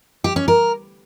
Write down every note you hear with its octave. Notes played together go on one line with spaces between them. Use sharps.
G4
C#4
A#4